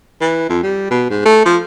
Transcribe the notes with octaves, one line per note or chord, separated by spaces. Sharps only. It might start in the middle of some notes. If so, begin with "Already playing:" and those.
E3
F2
G3
B2
G#2
A3
F3